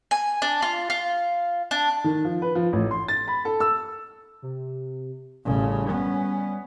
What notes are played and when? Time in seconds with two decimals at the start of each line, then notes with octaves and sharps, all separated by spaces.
0.11 G#5
0.42 D4
0.62 F4
0.90 F4
1.71 D4
2.04 D#3
2.25 F3
2.42 B4
2.55 F3
2.73 A1
2.91 C6
3.08 A6
3.28 B5
3.45 A4
3.60 E6
4.42 C3
5.45 A1 C#3 G3
5.90 B3 C#4